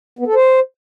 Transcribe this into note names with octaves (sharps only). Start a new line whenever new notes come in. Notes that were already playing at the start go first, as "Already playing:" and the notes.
B3
A4
C5